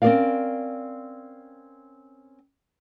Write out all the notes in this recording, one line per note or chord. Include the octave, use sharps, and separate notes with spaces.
C4 C#4 G#4 A#4 D5 F5